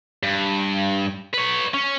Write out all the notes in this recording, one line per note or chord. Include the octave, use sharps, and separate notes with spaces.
G2
B4 C#5
C#4